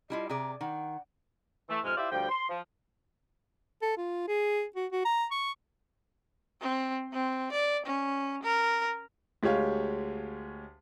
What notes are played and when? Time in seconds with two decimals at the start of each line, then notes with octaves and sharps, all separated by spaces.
0.10 G3 E4 F4 D#5
0.29 C3 G#4 D5 A#5
0.61 D#3 F#5
1.69 E3 A3
1.84 F2 G#2 C3 G#3 F6
1.97 E4 F4 G4 C5 D5 E5
2.11 D2 F3 G3 G5
2.29 C6
2.49 F3
3.82 A4
3.97 F4
4.28 G#4
4.76 F#4
4.92 F#4
5.05 A#5
5.31 C#6
6.62 C4
7.13 C4
7.53 D5
7.86 C#4
8.43 A#4
9.43 D2 G#3 G4 C#5 F5